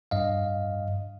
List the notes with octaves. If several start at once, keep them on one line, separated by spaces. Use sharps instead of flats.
G2 D#5 F5